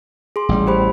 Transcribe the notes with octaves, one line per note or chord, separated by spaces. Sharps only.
G#4 C6
A1 G3
G4 C5 B5